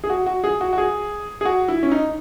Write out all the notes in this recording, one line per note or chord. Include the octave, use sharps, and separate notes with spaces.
G#4
F#4
F#4
G#4
F#4
F#4
G#4
G#4
F#4
E4
C#4
D#4